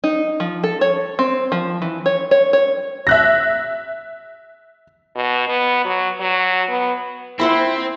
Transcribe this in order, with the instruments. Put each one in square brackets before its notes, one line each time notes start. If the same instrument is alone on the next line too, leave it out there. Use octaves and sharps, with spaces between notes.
[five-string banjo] D#4
F3
A4
C#5
C4
F3
E3
C#5
C#5
C#5
[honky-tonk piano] E5 F#6 A#6
[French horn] B2
B3
F#3
F#3
B3
[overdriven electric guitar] C4 [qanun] E4 C5 F#5 [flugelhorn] E5